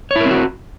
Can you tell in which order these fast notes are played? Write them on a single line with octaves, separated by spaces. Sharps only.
C#5 E4 A#4 C4 F#4